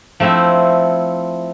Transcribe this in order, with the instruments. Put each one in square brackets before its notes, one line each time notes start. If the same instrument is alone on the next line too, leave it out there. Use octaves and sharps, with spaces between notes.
[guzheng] F3 A3 C4 E4